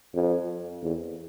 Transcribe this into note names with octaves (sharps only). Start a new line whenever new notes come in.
F2
E2